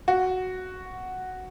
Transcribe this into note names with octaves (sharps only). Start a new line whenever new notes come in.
F#4